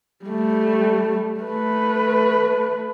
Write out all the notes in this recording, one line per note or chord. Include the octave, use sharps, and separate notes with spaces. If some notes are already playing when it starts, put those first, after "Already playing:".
G3 A3
A3 B4